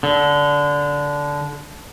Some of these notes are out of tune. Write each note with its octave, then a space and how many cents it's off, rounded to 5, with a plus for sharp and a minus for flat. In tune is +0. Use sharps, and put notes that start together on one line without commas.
D3 -15